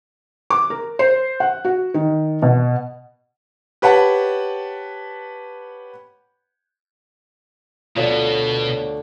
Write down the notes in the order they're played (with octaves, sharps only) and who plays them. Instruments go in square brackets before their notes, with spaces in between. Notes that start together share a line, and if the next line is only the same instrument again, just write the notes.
[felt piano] D6
A#4
C5
F#5
F#4
D#3
B2
[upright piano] G4 B4 C#5 F#5 A5
[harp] D2 [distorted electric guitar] B2 [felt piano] F4 C#5 D5